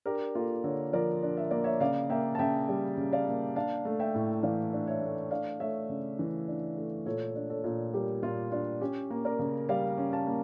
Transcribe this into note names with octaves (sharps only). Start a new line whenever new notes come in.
D4 G4 A#4
A#3 F4 A4
D3 A4 C#5
F3 A#4 D5
D4
E5
A#3 D5
C#5 E5
C#3 D5 F5
A#3 E5 G5
A5
C#3 E5 G5
G3
C#3
D5 F5
A#3
D4 F5 A5
A3
E5 G5
A2
E3 D5 F5
D4
C#5 E5
A3
D4 D5 F5
A3 C#5 E5
C#3
E3
D4
A3
A#2 A4 C#5
D4
A4 C#5
A#2
G3 G4 A#4
A#2 F4
D4 F4
C#4 G4
A#3
A#4 D5
C#3
G3 D5 F5
C#4
F5 A5
A#3